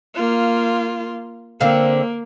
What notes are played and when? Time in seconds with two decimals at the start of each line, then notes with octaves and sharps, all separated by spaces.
0.15 A#3 F4
1.61 D3 A#3 C4 F5